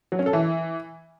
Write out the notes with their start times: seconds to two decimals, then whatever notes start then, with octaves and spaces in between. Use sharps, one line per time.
0.12 F#3
0.19 C#4
0.26 A4
0.33 E3